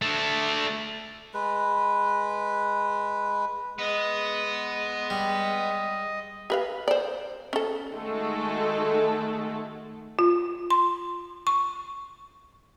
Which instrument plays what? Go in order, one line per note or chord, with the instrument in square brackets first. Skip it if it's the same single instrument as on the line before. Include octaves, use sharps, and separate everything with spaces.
[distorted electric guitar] A3 D4
[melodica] G#3 B4
[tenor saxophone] G#3 [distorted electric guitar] B3 [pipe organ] D#5
[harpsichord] G3
[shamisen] G4 B4 F5
C5 D5
C#4 A4
[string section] D#3 G#3 A3 F#4 A4
[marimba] F4
C6
C#6